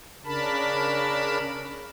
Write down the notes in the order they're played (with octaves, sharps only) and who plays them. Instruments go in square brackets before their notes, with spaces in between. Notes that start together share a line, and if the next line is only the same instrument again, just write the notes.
[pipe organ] C#3 D4 A#4 A5 B5